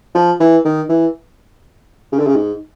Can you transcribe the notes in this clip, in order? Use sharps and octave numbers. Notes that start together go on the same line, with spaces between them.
F3
E3
D#3
E3
C#3
D3
C#3
G#2